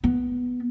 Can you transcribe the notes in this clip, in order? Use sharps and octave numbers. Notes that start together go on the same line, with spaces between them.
B3